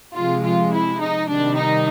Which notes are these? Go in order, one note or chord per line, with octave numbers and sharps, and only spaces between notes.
C3 F3 G#3 F4
F4
E4
D#4
C3 D#3 G3 D4
D#4